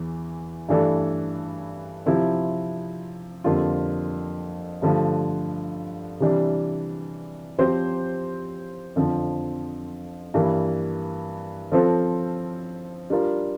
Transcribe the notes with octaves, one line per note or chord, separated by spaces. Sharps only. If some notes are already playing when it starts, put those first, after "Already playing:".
Already playing: E2 E3
G2 E3 A3 D4 A4
C3 F3 C4 E4
F2 D3 G3 A#3 F4
G2 D3 F3 A3
C3 E3 G3 D4
F3 C4 G4 C5
F2 D3 F3 C4
G2 E3 G3 A#3
F3 C4 F4 A4 C5
G3 D4 F4 A#4